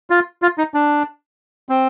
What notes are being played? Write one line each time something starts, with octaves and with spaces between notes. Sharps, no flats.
F4
F4
D#4
D4
C4